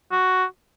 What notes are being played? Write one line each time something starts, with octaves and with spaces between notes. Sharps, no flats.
F#4